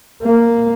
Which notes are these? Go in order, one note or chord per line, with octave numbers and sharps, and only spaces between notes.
A#3